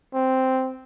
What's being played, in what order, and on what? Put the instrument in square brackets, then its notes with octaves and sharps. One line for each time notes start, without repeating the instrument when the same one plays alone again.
[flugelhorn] C4